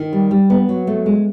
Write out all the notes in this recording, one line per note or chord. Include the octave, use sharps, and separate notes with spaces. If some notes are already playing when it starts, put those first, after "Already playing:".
Already playing: D#3
G3
G3
B3
F#3
A3
G#3